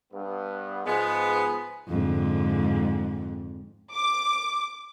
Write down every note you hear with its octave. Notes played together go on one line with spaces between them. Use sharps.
G2 B3
G#2 F3 G#3 B3 G#4
F2 G#2 D3
D6